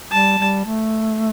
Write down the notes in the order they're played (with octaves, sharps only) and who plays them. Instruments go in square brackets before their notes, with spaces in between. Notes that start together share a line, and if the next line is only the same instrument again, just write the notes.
[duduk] G3 [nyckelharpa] A5
[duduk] G3
A3